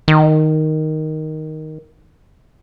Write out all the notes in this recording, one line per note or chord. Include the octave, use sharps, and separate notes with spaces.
D#3